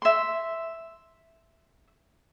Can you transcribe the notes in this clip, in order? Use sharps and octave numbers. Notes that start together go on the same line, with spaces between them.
E5 C6